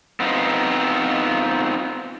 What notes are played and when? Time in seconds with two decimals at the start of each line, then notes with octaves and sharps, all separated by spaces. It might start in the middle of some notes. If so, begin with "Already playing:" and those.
0.20 B3 C4 D#4 F4